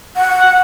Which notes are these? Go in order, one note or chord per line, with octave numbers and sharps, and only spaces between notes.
F#5